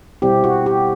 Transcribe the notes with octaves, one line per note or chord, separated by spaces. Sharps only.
B2 G3 C4 E4 G4
F#4
G4